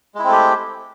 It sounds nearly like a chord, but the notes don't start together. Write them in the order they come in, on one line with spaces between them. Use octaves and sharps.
G#3 E4 C4 A3 G4